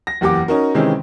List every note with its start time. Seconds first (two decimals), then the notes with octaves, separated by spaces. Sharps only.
0.07 A#6
0.21 F#1 E2 G4 F#5 D6
0.48 C#4 D#4 F#4 A#4
0.74 C3 D#3 E3 G#3 C4 C#4